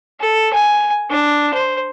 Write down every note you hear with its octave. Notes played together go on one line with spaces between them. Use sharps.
A4
G#5
D4
C5